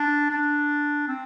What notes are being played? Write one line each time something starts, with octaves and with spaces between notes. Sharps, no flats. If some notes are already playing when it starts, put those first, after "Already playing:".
Already playing: D4
D4
C4